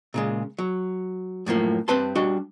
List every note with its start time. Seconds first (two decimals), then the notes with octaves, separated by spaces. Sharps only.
0.14 A#2 C#3 G#3
0.58 F#3
1.46 F#2 A2 F3 A#3
1.88 G2 C4 B4 A5 C6
2.15 G3 D4 F#4 D#5